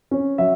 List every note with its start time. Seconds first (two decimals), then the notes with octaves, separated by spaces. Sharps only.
0.11 C#4
0.38 F#3 E5